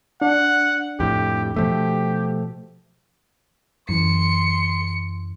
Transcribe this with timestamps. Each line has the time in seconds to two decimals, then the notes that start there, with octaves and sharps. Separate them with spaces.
0.22 D4 F#5
1.00 F2 A2 G4
1.56 B2 F3 A3 G4
3.89 F#2 E3 C6 C#7